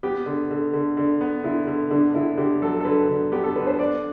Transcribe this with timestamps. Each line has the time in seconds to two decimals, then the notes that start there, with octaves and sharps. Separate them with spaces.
0.03 B3 G4
0.26 D3
0.51 D3
0.73 D3
0.97 D3
1.21 B3
1.44 D3 E4
1.67 D3
1.91 D3 D4
2.14 D3 E4
2.38 D3 G4
2.62 F#3 A4
2.80 A4
2.85 D3 B4
3.09 D3
3.32 B3 G4
3.44 A4
3.56 D3 B4
3.67 C5
3.79 D4 D5